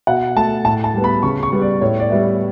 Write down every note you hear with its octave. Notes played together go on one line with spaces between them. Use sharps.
B2 F#5
A3 A5
A2 A5
A5
G3 B3
B5
C#3 C#6
C#6
G3 B3
D5
A2 C#5
D5
G3 B3 E5